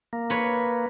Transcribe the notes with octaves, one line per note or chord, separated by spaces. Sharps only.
A#3
B4 C#5